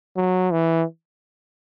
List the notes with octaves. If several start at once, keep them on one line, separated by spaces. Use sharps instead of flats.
F#3
E3